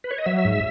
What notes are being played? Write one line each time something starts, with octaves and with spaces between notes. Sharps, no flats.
B4
C#5
D#5
F#3 E5
G#2